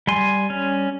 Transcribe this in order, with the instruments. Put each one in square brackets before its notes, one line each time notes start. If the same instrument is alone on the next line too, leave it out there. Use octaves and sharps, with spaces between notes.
[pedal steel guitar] G3 G#5 C6
C#4